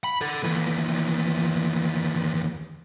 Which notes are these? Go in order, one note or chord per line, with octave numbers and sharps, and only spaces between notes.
B5
A4 F#5
D#2 E3